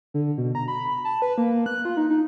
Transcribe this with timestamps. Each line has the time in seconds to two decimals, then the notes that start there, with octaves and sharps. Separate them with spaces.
0.14 D3
0.38 B2
0.55 A#5
0.68 B5
1.05 A5
1.22 B4
1.38 A#3
1.66 F#6
1.85 F4
1.97 D#4
2.10 D#4